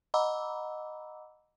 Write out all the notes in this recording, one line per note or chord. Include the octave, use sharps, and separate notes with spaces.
D#5 F#5 A#5 B5 D6 E6